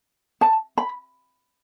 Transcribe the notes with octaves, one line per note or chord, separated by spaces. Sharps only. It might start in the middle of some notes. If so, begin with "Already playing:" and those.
A5
B5